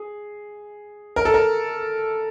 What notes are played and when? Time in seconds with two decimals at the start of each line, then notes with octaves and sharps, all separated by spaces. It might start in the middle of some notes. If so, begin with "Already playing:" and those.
Already playing: G#4
1.16 A#4
1.25 A4
1.34 A#4